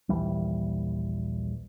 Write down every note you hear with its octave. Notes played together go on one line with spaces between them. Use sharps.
A#1 D#2 E3 G3